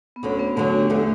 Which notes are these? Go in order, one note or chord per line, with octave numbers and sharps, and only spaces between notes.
B3
D2 D3 F#3 C#4
B3
D2 D3 F#3 A3
G4
E2 D3 A3